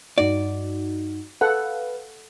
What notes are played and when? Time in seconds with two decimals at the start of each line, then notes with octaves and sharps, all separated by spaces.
0.18 G2 D#4 F#4 D5
1.41 A4 B4 F5 F#5